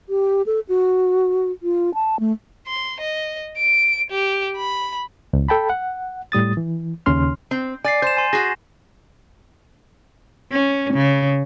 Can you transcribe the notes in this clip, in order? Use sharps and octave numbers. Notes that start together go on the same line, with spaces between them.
G4
A4
F#4
F4
A5
A3
C6
D#5
D7
G4
B5
C#2
A4 G5 A5 B5
F#5
A2 G3 D#6 A6
E3
D#2 C#3 C#4 C6 F6
C4
D5 G#5 A6 C7
C5 G6 E7
G#5 C6
F#4 G#4 A#6
C#4
C#3